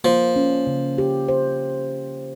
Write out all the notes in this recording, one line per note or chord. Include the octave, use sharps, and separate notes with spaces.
F3 A#3
C#4
C#3
G4
C5